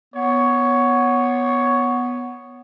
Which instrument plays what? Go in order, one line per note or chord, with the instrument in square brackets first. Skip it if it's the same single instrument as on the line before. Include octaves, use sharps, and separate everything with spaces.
[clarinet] B3 [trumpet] C#5